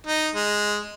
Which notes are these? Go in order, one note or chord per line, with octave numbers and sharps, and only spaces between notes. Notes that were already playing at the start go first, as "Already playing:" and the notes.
D#4
G#3